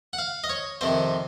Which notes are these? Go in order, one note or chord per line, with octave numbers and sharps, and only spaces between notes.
F#5
F5
D#5
C#5
F2 C3 D#3 C5